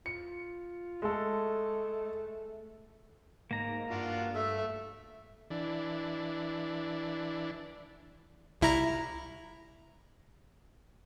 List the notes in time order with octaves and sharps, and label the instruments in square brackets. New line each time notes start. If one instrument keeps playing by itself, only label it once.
[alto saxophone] F4 [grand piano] C#7
[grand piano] G#3 A4 [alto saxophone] A3
[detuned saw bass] G#2 [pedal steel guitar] A#3 A#5
[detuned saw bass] G2 [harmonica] D4 F4 F#4
[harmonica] A3 [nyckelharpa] E5
[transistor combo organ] E3 D4
[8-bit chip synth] C2 E4 A#5